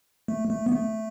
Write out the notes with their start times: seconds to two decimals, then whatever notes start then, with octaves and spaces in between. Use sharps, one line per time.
0.28 A3
0.50 A3
0.67 B3
0.72 A3